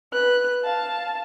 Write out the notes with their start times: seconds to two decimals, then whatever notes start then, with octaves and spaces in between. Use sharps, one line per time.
0.13 B4 F#6
0.63 F5 A5